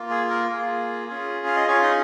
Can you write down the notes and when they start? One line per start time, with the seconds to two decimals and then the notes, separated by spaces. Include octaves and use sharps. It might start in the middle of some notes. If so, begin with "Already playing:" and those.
Already playing: A#3 F4
0.10 G#4
0.30 A#4
0.50 A#3 F4 G#4
1.08 C#4 F4 G#4
1.46 F5
1.56 D#5
1.67 C#4 F4 G#4 C#5
1.82 D#4 D#5